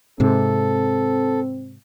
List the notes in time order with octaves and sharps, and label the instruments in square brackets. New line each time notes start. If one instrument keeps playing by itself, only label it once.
[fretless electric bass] G#2 C3 [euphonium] C4 [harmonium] A4